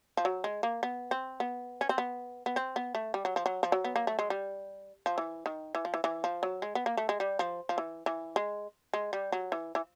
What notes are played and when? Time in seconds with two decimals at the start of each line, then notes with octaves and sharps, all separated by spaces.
0.17 F3
0.25 F#3
0.44 G#3
0.63 A#3
0.83 B3
1.11 C4
1.40 B3
1.81 C#4
1.89 C4
1.98 B3
2.46 B3
2.56 C4
2.76 B3
2.95 A3
3.14 G3
3.25 F#3
3.36 F3
3.46 F#3
3.63 F3
3.72 F#3
3.84 B3
3.96 A#3
4.07 A3
4.19 G#3
4.30 G3
5.06 F3
5.18 E3
5.46 D#3
5.75 E3
5.85 F3
5.94 E3
6.04 E3
6.24 F3
6.43 F#3
6.62 G#3
6.75 B3
6.86 A#3
6.97 A3
7.09 G#3
7.20 G3
7.39 F3
7.69 F3
7.78 E3
8.06 E3
8.36 G#3
8.94 G#3
9.13 G3
9.32 F#3
9.52 E3
9.75 E3